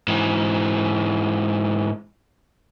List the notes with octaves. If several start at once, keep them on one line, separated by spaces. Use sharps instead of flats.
G#2 E3